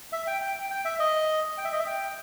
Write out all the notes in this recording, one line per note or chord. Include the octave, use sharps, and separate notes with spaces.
E5
G5
G5
G5
G5
E5
D#5
G5
E5
D#5
E5
G5